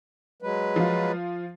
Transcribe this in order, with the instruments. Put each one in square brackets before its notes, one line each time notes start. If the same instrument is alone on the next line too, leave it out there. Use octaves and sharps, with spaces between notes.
[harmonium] F#3 G#3 B4
[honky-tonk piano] F3 F4